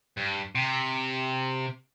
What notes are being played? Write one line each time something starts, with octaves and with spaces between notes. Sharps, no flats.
G2
C3